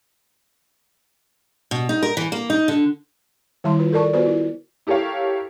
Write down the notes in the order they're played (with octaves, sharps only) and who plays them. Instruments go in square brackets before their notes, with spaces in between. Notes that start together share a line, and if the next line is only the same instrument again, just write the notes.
[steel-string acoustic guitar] B2
D#4
A#4
E3
A#3
D#4
D3
[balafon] D#3 G3 E4 E5 A5 C6
F4 B4
A4 A#4 D5 A5 C#6
B3 F4 F#4 B4 C5 D5
E4
[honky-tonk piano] E4 G4 A4 A#4 C#5 F5